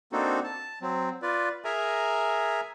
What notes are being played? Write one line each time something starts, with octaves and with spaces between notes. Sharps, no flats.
A#3 C4 D4 D#4 F#4 A4
A5
F#3 C4
F4 B4 D5
G#4 A#4 E5 G#5 A#5